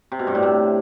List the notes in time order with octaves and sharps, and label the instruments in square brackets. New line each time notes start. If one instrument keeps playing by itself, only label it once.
[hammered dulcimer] C3
B2
G2
A2
C3